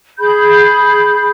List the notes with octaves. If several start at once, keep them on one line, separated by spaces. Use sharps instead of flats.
G#4 B5 G6